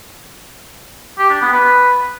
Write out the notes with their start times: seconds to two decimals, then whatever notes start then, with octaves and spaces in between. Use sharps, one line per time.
1.18 G4
1.30 D4
1.42 B3
1.53 B4